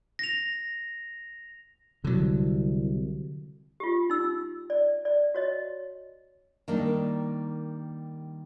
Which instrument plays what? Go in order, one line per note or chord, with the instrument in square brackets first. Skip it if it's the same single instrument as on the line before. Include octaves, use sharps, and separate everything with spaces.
[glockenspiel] A#6 F7
[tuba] C2 [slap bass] D3 F#3
[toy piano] F4 G4
D#4 E6
D5
D5
F#4 C#5 D#5
[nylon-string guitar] D#3 G3 A#3 D4